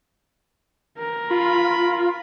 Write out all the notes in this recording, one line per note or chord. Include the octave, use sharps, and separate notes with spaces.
A#4
F4 B5